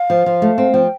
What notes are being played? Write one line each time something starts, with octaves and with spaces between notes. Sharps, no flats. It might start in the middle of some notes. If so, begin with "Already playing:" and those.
Already playing: F5
F3
F3
A3
C4
F3 G5